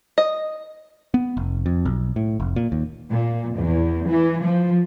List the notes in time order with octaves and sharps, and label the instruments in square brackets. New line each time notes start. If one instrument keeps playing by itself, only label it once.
[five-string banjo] D#5
[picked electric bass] B3
F1
F2
B1
A2
F1
A#2
D#2
[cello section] A#2
E2
E3
F3